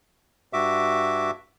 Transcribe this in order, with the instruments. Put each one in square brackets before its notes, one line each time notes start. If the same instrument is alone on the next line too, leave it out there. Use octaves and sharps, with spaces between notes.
[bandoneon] G2 F#4 E5 D6